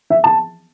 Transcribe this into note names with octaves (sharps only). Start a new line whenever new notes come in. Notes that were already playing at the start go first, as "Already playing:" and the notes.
E5
A5